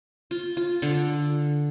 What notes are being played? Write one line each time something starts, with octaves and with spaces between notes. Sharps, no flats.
F4
F4
D3